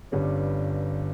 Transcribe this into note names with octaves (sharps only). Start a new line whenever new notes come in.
G1 G2 G3 C#4